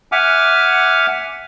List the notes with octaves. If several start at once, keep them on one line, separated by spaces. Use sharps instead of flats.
E5 F#5 G#5 D6 F6